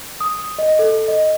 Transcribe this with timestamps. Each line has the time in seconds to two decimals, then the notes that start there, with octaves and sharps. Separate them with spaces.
0.21 D#6
0.59 D#5
0.79 A4
1.08 D#5